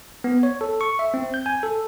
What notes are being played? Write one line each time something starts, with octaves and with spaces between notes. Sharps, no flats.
B3
C#5
A4
C#6
E5
C4
G6
G#5
A4